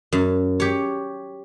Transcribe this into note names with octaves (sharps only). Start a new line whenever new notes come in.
F#2
G4 C#5